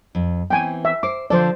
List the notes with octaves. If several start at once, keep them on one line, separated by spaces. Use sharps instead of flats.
F2
E3 B3 C4 G5 G#5
E5
C5 D6
D3 F3 A4 C5 D5